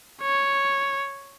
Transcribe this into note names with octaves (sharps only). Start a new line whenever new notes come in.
C#5